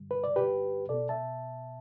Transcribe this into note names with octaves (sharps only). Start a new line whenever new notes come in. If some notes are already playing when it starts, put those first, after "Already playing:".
Already playing: G2 D3 G3
B4
D5
G4 B4
B2 B3 A4 D5
E5 A5